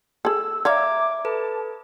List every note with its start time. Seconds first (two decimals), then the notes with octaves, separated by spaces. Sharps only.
0.25 G#4 A4 E6
0.65 C#5 D5 E5 F5 A#5 D6 G#6
1.25 A4 B4 A5